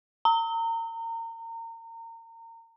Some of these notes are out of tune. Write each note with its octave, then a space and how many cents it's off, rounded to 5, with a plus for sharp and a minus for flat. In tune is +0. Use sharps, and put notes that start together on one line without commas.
A#5 -30